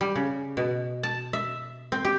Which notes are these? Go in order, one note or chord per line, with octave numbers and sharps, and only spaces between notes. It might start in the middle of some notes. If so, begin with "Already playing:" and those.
G3
C#3
B2
A5
E5
C4
G4